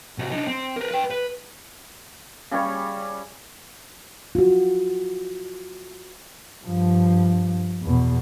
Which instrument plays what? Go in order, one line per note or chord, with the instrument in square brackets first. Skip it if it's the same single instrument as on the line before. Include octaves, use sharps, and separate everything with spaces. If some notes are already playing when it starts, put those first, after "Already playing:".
[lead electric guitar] C3 F#4
D4 D#4
C4
A#4 B4
B4 G5
B4
[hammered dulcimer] C#3 G3 C#5
[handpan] F4 F#4
[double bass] G2 F3
E2 B2